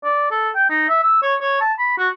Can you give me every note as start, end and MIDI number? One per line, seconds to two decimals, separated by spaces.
0.04 0.31 74
0.31 0.49 69
0.55 0.66 79
0.70 0.88 63
0.89 0.99 76
1.04 1.18 88
1.22 1.35 73
1.41 1.57 73
1.61 1.73 81
1.78 1.94 83
1.98 2.09 66